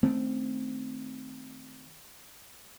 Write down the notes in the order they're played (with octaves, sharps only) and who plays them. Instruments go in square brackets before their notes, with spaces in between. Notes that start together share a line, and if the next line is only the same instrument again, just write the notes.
[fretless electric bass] D#3 A3 C4 C#4